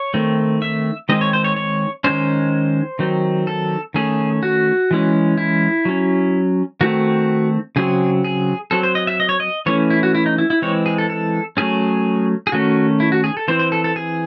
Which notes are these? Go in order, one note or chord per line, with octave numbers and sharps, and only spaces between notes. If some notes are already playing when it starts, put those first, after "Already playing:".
Already playing: C#5
D#3 A3 C4
E5
D#3 G#3 C4 D#5
C#5
C5
C#5
C#5
D#3 G#3 C#4 C5
D#3 F#3 C4
A4
D#3 A3 C#4 G#4
F#4
E3 G#3 C#4
E4
F#3 C#4
D#3 A3 C4 F#4
C#3 F#3 C4 G#4
G#4
F#3 C4 A4
C5
D#5
E5
D#5
C#5
D#5
E3 A3 C#4 C#5
E4
F#4
E4
D#4
E4
E4
E3 G#3 C4 C#5
G#4
A4
A4
F#3 A3 C#4 G#4
G#4
D#3 A3 C#4 F#4
E4
F#4
G#4
A4
E3 C4 C5
C5
A4
A4
G#4